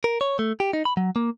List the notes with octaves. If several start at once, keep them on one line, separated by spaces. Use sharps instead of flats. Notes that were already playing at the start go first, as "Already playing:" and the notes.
A#4
C#5
A3
G4
D#4
B5
F#3
A#3